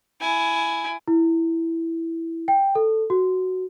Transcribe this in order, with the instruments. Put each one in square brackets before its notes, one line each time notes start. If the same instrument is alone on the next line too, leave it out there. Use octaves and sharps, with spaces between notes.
[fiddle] E4 G#5
[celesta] E4
G5
A4
F#4